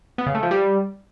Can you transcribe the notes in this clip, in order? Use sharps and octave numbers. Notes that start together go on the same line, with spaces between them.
B3
C#3
A3
F3
G3